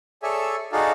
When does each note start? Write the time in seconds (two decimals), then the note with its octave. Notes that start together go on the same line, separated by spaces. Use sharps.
0.23 G#4 A4 C#5 D5 E5 G#5
0.73 D#4 F#4 G#4 A4 D5 F5